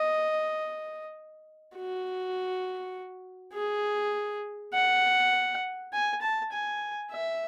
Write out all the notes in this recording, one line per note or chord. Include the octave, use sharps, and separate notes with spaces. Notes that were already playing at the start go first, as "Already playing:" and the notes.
Already playing: D#5
F#4
G#4
F#5
G#5
A5
G#5
E5